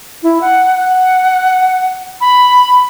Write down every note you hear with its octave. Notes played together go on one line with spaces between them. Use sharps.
E4
F#5
F#5
B5